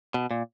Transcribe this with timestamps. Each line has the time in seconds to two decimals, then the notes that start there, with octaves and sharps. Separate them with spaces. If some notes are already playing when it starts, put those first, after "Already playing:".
0.14 B2
0.31 A#2